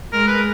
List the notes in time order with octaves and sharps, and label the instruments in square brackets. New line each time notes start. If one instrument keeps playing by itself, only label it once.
[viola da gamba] G#3 [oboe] A#4
[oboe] B4